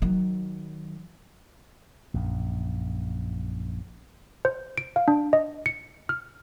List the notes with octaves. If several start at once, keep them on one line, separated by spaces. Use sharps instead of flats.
D#3 F#3
A#1 F#2
C5
D7
F5
D4
D#5
C#7
F6